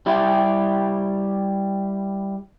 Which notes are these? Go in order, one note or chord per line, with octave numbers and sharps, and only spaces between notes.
G3 E4 G4